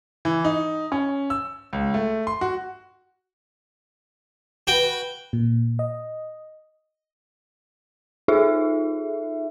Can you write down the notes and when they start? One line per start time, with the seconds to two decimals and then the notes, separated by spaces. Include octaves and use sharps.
0.25 E3
0.45 D#4
0.92 C#4
1.30 E6
1.73 C#2
1.94 A3
2.27 C6
2.41 F#4
4.67 F#4 B4 G5
5.33 A#2
5.79 D#5
8.28 D#4 F4 G#4 A4 E5